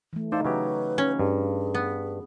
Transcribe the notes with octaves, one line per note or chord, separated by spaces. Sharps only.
E3 A3
D#4 A4 C5 D5 F5
C#3 F#3 G4 B4
C#4
G2 G#4
B3